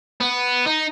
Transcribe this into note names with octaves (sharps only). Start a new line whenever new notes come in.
B3
D#4